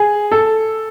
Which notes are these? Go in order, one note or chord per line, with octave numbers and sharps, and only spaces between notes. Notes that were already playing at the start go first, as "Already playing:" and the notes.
Already playing: G#4
A4